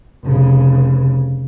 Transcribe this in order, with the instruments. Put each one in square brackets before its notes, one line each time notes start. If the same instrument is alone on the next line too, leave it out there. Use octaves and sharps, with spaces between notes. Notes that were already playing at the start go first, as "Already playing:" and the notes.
[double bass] F1 C#3